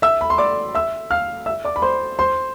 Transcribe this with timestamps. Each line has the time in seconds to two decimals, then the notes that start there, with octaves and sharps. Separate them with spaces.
0.02 E5 E6
0.21 B5
0.30 C6
0.38 D5 D6
0.75 E5 E6
1.10 F5 F6
1.46 E5 E6
1.65 D5 D6
1.76 B5
1.82 C5 C6
2.19 C5 C6